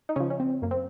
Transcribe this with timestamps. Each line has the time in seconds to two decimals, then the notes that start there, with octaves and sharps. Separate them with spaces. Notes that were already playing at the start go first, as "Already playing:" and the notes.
0.09 D#4
0.16 C#3 F3 C#4
0.30 C#4
0.40 C4
0.62 F#2 A#3
0.71 C4